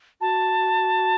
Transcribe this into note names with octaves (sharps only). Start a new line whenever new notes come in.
F#4 A5